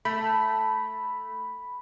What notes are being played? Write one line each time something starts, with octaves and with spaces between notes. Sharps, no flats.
A3 B5